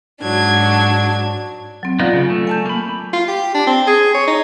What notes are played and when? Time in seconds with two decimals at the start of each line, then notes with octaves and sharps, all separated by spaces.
0.23 G#2 F#3 D4 G#6
1.83 F#3 C4
1.99 B3 D#4 F4 D5 F5
2.13 C#3
2.30 A3
2.47 G#5 A5 G6
2.66 A#3 B5
3.13 F4
3.28 G4
3.54 D4
3.67 C4
3.87 G#4
4.14 C#5
4.27 D#4